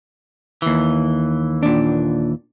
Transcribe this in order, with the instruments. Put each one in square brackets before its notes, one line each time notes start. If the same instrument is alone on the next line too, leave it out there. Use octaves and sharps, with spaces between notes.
[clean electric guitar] D#2 E3
[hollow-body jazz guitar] A#2 D4